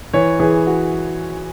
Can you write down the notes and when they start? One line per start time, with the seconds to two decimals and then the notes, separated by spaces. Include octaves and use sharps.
0.13 E3 C#5
0.40 E3 G#4
0.67 F#4